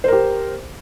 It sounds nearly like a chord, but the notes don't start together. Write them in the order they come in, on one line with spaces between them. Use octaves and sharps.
C5 A#4 G4